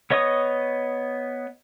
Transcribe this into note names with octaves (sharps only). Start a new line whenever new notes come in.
B3 C#5 D#5 C#6 D#6